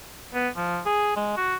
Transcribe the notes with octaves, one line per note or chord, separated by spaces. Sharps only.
B3
F3
G#4
G#3
F#4